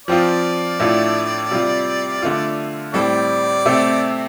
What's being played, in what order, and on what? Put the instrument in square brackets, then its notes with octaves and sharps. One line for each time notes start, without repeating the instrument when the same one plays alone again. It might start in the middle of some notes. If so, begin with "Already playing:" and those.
[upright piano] F3 C4 F4 [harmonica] D5
[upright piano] A2 A3 D4 F4
C3 G3 F4
D3 A3 F4
[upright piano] A2 G3 C4 [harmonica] A4 D5
[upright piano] C3 A3 C4